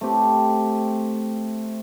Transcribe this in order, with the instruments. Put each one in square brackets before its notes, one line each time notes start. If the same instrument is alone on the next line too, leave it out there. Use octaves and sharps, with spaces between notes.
[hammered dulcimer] A3 C4 G4